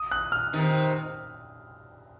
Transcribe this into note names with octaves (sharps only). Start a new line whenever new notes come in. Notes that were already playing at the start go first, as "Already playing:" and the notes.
Already playing: D#6
F#6
F6
C3 D#3